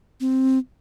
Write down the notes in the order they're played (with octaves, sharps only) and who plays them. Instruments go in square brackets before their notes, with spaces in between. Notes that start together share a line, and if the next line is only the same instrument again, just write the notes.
[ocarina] C4